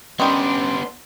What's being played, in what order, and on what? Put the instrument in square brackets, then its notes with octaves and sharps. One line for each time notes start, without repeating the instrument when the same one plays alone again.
[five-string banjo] D#3 G3 [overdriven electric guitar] B3 D4 [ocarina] C#4 [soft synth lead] C6